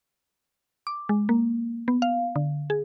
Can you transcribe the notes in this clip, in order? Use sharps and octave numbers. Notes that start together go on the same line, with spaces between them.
D6
G#3
A#3
B3
F5
D3
G#4